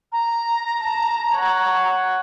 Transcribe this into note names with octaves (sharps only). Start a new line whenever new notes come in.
A#5
A5
C#5 F#5